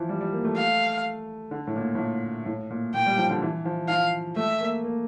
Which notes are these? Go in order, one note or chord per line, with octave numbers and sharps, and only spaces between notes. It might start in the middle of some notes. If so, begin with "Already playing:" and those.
Already playing: E3 F3
G3
G3
A#3
A3
F5
D3
A2
A#2
A2
A#2
A2
A#2
A#2 G5
G3
F3
D3
E3
F3
F3 F5
A3 E5
A#3
A#3